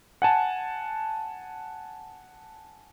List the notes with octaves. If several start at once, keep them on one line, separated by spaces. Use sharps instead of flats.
F#5 G#5 A5